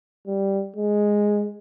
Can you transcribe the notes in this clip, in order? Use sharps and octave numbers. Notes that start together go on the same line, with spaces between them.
G3
G#3